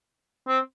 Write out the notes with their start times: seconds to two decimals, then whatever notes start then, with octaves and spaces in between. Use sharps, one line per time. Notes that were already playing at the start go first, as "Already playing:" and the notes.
0.48 C4